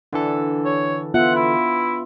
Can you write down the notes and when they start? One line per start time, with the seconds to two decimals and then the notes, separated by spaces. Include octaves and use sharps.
0.13 D3 E3 D4 A4
0.65 C#5
1.14 B3 F4 E5 F#5
1.35 E4